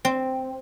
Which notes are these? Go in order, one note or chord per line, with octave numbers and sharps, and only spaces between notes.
C4